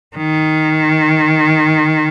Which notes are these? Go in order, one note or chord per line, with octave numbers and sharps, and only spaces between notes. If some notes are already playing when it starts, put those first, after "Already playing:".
D#3